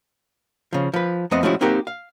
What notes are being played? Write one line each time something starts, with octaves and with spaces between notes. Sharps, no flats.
C#3 F3
F3 B4
F2 A3 B3 C4 D#5 F#5
F3 G#3 A3 C#4 E4 F#4
A#3 C4 D#4 F#4 G4 A#4
F5